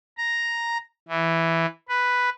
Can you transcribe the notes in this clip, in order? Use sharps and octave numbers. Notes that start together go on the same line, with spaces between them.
A#5
E3
B4